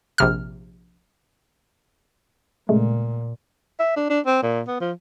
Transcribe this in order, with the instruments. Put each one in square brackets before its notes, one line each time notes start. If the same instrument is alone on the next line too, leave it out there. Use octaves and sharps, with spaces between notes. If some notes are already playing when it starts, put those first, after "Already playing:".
[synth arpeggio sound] A#1 C3 F6
[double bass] A#2 [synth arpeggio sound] C#3 G#3 A3
[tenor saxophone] E5
D4
D4
C4
A#2
B3
F3